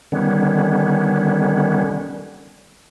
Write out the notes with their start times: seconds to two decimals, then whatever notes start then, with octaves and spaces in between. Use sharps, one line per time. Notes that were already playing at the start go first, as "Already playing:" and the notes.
0.12 D3 D#3 G3 B3 C#4